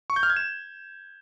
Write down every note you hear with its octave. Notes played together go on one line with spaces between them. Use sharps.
C#6
G6
F6
G#6
E7